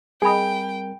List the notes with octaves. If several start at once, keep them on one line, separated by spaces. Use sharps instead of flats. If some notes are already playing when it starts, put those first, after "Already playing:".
G3 C4 G#4 A#4 D#5 G5 G#5 B5